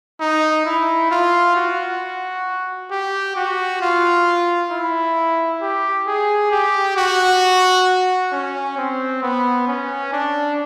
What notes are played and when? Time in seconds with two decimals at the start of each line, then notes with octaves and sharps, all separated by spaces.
0.21 D#4
0.66 E4
1.11 F4
1.56 F#4
2.91 G4
3.36 F#4
3.81 F4
4.71 E4
5.62 G4
6.07 G#4
6.52 G4
6.97 F#4
8.32 C#4
8.78 C4
9.23 B3
9.68 C#4
10.13 D4